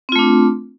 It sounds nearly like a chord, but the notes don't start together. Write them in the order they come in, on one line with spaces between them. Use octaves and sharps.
C4 F4 A3 D4